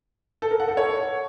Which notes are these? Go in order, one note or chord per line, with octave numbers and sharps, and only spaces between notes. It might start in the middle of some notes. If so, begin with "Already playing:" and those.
A4
A#4
F#5
A4
C#5